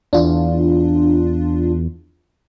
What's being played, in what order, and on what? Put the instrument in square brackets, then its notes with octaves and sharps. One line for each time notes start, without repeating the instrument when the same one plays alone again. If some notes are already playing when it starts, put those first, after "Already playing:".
[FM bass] E2 [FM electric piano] D4 F4